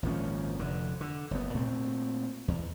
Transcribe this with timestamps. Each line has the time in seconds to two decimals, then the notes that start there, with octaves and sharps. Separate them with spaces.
0.03 G#1 A#2 F3 C#4
0.59 F1 D3
1.01 D3
1.31 F#1 B3
1.54 A#2 A3 C4
2.48 E2